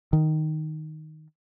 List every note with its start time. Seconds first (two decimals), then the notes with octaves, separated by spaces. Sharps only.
0.13 D#3